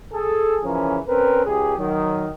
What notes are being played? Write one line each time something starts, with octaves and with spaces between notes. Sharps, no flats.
G#4 A4
C#3 E3 F3 C#4 A#4
C4 C#4 A#4 B4
C#2 G4 G#4
D#3 F#3